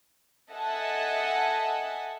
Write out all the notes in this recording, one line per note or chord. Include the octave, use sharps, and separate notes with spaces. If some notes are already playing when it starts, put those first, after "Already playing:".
A4 D#5 E5 F#5 G#5 A5